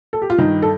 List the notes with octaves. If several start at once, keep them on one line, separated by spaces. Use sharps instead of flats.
A4
G4
F4
G2 D#3 D#4
A4